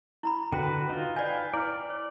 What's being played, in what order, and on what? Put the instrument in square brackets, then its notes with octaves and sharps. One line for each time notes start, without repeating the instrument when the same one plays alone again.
[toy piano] E4 A#5 B5
[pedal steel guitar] D3 F#4 B4 [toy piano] G5
[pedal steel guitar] D#4 F4
[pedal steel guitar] B4 F5 G5 [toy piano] D5 G#5
[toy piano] E4 [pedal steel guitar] D5 F6
[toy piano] C#5